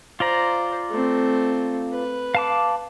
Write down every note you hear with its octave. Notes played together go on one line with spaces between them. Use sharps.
F4 C5 D5 A#5
A3 C4
B4
F5 A5 D6